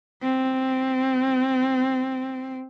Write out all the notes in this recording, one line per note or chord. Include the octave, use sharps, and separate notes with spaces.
C4